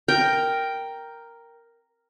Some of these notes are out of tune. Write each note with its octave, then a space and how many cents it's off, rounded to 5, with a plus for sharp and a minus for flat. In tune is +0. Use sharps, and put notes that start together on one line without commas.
A#4 +0 G5 +0